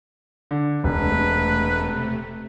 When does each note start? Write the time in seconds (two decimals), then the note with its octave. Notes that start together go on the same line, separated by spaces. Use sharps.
0.51 D3
0.84 E1 C3 A3 B4